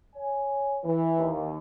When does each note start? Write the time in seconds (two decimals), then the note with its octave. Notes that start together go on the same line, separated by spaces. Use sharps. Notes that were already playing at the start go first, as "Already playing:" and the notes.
0.15 C#5 G#5
0.84 E3
1.17 D#2